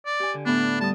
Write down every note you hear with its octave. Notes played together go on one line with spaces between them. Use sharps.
D5
G4 G#5
D3
A2 B3 D4
G3 A5 D#6